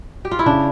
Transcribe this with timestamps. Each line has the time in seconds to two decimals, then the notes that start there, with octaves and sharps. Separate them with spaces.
0.25 G4
0.31 F4
0.39 E4
0.46 C#3 D4